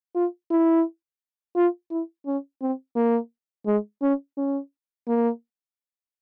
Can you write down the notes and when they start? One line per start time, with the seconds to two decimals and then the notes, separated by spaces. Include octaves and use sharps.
0.15 F4
0.51 E4
1.56 F4
1.91 E4
2.26 C#4
2.62 C4
2.96 A#3
3.66 G#3
4.02 C#4
4.37 C#4
5.08 A#3